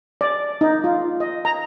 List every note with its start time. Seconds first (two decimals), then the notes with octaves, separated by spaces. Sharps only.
0.21 D5
0.61 D#4
0.84 F4
1.20 D#5
1.45 A#5